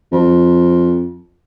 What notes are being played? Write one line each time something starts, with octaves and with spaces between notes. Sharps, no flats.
F2